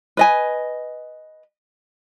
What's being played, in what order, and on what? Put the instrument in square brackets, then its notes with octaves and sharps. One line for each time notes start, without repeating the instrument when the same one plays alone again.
[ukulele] B4 D#5 G#5